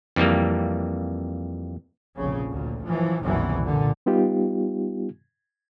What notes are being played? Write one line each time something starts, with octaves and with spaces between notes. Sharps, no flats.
F2 E3 G3 A#3
F1 A#1 C#3
D2 A#2
F#2 E3 F3
F#1 C2 B2 D#3 E3
A#2 D3
G3 B3 D#4 F4 G4